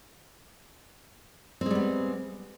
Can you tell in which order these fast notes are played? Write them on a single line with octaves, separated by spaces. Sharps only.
C4 G#3 G3 B3